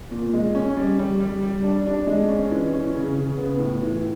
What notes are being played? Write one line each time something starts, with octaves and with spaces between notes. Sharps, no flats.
A#2
G#3
C#4
G3
G3
G3
G3
D4
D4
G#3
C#4
E3
C#4
C#3
C#3
B3
A2
E3